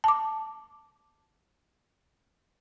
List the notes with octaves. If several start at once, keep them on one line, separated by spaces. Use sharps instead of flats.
A5 D6